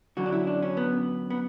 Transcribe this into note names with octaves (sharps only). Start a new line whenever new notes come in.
F#2 D3 F#3 F#4
D4
E4
D4
C#4
B3
B3